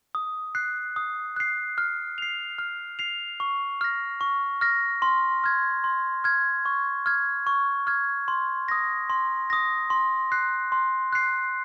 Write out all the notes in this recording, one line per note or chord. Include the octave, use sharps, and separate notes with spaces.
D#6
F#6 C7
D#6
F#6 C7
F6
C7 F7
F6
C7 F7
C#6
F6 A#6
C#6
F6 A#6
C6
F6 G#6
C6
F6 G#6
C#6
F6 G#6
C#6
F6 G#6
C6
D#6 A#6
C6
D#6 A#6
C6
F#6 C7
C6
F#6 C7